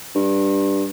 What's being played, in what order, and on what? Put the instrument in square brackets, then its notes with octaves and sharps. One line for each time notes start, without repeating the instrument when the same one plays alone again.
[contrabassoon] G2